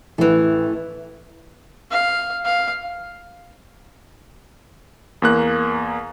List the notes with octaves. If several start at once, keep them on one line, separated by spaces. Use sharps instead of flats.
A1 E3 A3 B4
F5
F5
E2 A#3 F#6